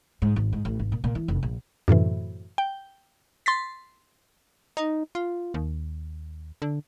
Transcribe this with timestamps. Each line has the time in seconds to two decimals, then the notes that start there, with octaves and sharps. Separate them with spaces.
0.22 G#2
0.36 G#1
0.52 G#2
0.65 A1
0.79 G#1
0.92 A#2
1.04 A#2
1.15 E3
1.28 F1
1.43 A#1
1.88 F#2 A2 C3 E3
2.58 G5
3.46 C6 A6 B6
4.77 D#4
5.15 F4
5.54 D#2
6.62 D3